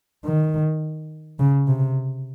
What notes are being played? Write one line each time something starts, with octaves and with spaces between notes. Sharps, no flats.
D#3
C#3
C3